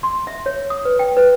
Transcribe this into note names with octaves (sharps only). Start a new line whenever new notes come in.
C6
E5
C#5
D#6
B4
G5
B4